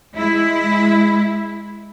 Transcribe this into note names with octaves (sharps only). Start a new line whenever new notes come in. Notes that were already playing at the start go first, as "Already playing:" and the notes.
G#3 E4